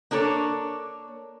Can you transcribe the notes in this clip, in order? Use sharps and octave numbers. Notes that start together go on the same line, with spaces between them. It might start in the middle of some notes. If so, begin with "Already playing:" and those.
A#3 D4 A4 C#5